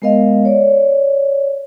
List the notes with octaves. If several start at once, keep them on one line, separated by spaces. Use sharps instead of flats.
G#3 B3 A#4 D#5 F5
C#5 D5